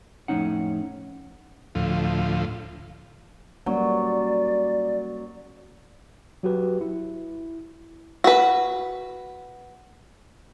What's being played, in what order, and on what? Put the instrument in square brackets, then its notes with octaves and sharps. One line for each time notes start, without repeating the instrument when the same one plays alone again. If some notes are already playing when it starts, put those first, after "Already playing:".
[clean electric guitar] F2 A2 A3 C#4 D#4 F#5
[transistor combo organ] D2 A2 F3
[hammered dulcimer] F#3 [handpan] G3 A#3 C#4 [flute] D5
[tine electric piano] F#3 F#4 G4 B4
E4
[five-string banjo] F#4 B4